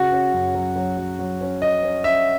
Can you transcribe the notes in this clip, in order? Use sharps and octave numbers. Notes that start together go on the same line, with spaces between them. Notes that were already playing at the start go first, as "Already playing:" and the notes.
Already playing: C#3 F#4
C#4
F#2
F#3
F#3
F#3
F#3
C#4
C#4 D#5
C#4
C#4 E5